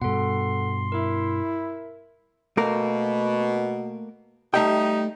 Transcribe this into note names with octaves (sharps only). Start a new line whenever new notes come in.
G2 B2 A4 F#5 C6
E4 A#4 E5
B2 A3 A#3 A#4
G3 A3 D#4 E5 G5